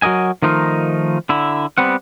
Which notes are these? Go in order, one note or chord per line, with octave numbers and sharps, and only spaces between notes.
F#3 F#4 A#4 D#5 G#5
D#3 F3 A3 D#4 F4 A#4
D3 E4
G3 B3 C4 F#5